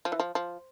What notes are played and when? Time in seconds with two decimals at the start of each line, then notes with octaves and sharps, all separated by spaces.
0.05 F3
0.12 E3
0.20 F3
0.35 F3